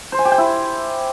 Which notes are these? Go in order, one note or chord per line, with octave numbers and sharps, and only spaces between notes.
C5
G#5
G4
G5
E4